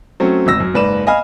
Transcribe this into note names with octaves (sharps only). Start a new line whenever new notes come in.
F#3 A3 C4 C#4
G#1 D2 E6 A#6
F#2
F#1 G#2 B4 D5 E7
D#5 F5 G#5 B5 F6